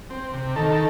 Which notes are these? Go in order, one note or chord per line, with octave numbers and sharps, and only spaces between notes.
C4
C3
D#3 A4